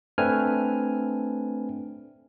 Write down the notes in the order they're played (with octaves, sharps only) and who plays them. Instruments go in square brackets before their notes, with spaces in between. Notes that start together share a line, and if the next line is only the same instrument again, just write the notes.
[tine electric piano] A3 C4 D4 B4 G#5 F6